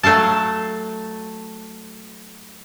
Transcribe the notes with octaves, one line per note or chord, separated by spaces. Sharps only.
F#3 A3 A4 F5 A5